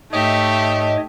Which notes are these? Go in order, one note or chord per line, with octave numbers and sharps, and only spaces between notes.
G#2 A3 G4 C#5 D#5 E5